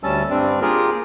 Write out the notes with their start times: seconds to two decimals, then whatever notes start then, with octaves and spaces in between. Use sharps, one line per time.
0.03 D2 G3 C#4 A5 E6
0.30 G2 G3 C4 D4
0.62 A#3 F4 G4 G#4 A#4